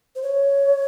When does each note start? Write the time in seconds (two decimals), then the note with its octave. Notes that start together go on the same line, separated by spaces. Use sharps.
0.16 C5
0.22 C#5